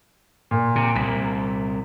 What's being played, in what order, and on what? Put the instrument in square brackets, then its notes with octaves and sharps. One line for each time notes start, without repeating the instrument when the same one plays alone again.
[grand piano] A#2
[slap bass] C3
[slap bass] C2 A#2 [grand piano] B6